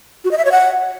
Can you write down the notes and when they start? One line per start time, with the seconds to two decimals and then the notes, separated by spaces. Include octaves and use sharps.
0.25 F#4
0.31 D#5
0.38 E5
0.45 C#5
0.52 F#5